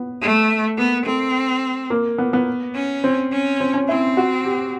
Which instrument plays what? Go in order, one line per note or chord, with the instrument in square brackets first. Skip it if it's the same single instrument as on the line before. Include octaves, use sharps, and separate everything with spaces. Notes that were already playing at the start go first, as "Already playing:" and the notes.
Already playing: [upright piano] B3
[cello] A3
[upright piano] A#3 [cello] B3
[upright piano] A3 [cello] C4
[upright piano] A#3
B3
B3
[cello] C#4
[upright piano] C4
[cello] C#4
[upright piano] C4
C#4
[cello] C4 [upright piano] E4
[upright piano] F#4
G4